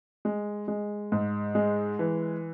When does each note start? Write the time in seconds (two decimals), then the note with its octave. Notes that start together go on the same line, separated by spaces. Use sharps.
0.25 G#3
0.68 G#3
1.12 G#2
1.55 G#3
1.99 E3